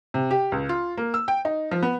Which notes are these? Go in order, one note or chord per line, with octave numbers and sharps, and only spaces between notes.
C3
G4
C#2
F4
A#3
E6
G5
D#4
F3
B3